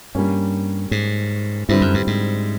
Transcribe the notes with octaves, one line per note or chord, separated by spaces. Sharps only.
G2 G3 A#3 C#4
G#2
G2 D3 G3 C4 E4
F#2
G2
G#2